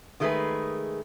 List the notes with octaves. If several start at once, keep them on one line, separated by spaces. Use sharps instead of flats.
D#3 G#3 A3 C#4 G#4 B4